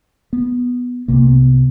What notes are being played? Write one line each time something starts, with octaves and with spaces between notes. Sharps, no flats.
B3
C2 C3 A#3
B3